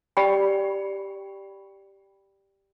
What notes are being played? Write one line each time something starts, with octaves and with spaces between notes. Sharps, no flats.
G4 D5 G5 B5